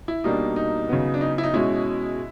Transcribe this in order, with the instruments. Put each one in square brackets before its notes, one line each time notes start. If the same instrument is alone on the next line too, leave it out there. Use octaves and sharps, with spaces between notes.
[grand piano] E4
B2 G3 A#3 D4 D#4
D#4
C#3 F#3 B3
D4
D#4
E4
D#4
B2 G#3 C#4 E4